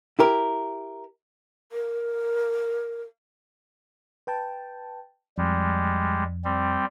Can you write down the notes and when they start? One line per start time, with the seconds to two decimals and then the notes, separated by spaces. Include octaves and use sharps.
0.19 E4 G4 A#4
1.72 A#4
4.27 B4 G5 A5
5.38 F2 G3 G#3
6.45 G3 C4